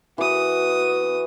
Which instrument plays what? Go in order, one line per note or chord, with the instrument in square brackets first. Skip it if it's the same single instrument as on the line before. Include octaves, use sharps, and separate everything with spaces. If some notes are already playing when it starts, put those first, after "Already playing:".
[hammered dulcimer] E3 [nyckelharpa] F#4 D#6